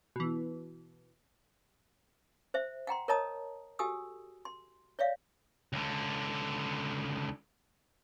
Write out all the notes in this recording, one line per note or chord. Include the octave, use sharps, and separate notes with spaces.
B2 E3
C5 E5
F#5 G5 A#5 C6
A#4 C#5 D#5 A5 A#5 D#6
F#4 G4 A4 G#5 D#6 E6
C6
C#5 D5 E5 F5
C#2 D3